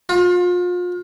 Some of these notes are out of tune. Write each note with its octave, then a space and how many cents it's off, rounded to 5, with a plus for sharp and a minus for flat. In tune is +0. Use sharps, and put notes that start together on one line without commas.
F4 +35